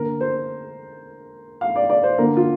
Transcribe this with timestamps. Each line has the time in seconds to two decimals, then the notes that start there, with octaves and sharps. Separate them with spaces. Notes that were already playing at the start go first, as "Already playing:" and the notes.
Already playing: D3 A#3 A#4
0.21 C5
1.61 F5
1.76 D5
1.90 D5
2.03 C5
2.18 D3 A#3 A#4
2.37 F4